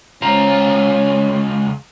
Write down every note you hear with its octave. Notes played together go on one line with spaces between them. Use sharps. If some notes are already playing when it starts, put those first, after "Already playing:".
C#2 C#4 F4 C5 A#5